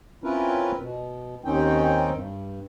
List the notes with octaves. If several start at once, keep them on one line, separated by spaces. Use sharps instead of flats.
C4 C#4 E4 F4 A#4 B4
B2
D#2 D#3 C4 C#4 D#4 G5
G2